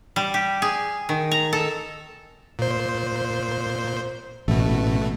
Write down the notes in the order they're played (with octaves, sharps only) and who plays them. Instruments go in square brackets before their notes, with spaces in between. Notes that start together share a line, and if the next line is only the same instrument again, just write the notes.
[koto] G3
G4
G#4
D#3
A#5
A4
[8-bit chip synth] A#2 C5
[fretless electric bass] A1 [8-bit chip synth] B2 A3